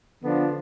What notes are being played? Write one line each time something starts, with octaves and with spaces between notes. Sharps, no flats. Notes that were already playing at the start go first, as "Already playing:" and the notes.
D3 F3 B3 D4